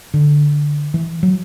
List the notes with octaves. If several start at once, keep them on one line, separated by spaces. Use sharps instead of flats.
D3
E3
F#3